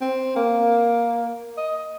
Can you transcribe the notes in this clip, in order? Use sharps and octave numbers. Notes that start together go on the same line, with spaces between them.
C4
A#3
D#5